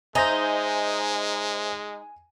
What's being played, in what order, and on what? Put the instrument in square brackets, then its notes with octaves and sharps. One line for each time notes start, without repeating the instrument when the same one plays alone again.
[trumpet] G#3 [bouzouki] D#4 [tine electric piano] C5 E5 A#5 [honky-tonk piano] G#5 A#6